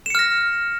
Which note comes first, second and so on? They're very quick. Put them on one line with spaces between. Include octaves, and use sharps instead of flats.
E7 C#7 F6 A#6